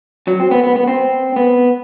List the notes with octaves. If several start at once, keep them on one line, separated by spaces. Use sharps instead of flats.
F#3
C4
B3
B3
B3
C4
B3